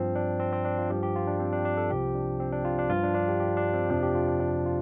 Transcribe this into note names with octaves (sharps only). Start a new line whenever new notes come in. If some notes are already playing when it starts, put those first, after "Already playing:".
Already playing: G2 F3 C4
D4
C4
C4
D4
F4
G2 F3 G4
G4
F4
D4
C4
D4
D4
A4
C2 C3 F3 G4
D4
C4
D4
F4
D4
G2 F3 F4
D4
D4
G4
G4
D4
C4
F2 C3 F3 D4
G4
F4
D4
D4
F4